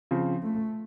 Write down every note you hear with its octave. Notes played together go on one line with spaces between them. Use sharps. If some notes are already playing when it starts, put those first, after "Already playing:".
C#3 F3 C4
A3